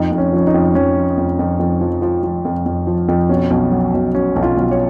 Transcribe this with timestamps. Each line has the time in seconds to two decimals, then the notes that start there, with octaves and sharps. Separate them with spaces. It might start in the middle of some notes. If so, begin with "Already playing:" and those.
Already playing: F2 D#4
0.12 F2
0.18 C#4
0.33 F3 C#4
0.47 D#4
0.54 F2
0.75 F2 C#4
0.97 F3
1.17 F2
1.39 F2
1.59 F2
1.81 F3
2.02 F3
2.23 F3
2.45 F2
2.66 F2
2.87 F3
3.08 F2
3.29 B2 C#4
3.50 B1
3.72 F#3
3.94 B1
4.15 F#3 C#4
4.36 B1
4.43 F4
4.57 B1
4.71 C#5